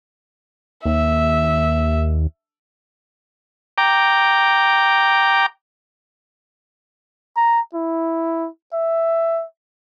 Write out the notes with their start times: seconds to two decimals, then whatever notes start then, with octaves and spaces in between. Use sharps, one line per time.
0.86 D#2 E5
3.78 G5 A#5 D6
7.37 A#5
7.74 E4
8.73 E5